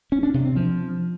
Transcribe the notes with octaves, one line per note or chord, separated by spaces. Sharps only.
C#4
D4
C3
C4
F3